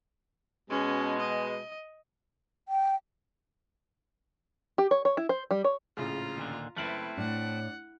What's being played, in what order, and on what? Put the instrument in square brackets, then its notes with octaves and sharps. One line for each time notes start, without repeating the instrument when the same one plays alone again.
[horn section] B2 G#3 [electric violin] C#4
[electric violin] D#5
[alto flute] G5
[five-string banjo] G4
C#5
C#5
E4
C5
G3
C#5
[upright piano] A#1 A2 C#3 [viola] F4 A#5
[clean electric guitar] D#2 A#2 D3
[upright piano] F#1 F6 F#7 [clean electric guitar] A3 C4 [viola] E4 B4
[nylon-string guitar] A2 [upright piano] D4 [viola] F#5